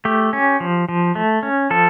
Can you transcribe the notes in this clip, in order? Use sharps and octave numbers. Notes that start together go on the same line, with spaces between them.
A3 G4
C#4
F3
F3
A3
C#4
F3 A4